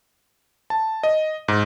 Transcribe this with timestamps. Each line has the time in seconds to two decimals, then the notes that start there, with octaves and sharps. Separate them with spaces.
0.70 A5
1.03 D#5
1.48 G#2